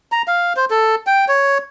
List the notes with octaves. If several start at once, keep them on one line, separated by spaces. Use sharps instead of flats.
A#5
F5
C5
A4
G5
C#5